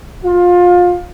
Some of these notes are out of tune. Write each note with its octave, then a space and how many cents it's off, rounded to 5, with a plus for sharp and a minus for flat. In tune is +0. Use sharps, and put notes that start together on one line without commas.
F4 +25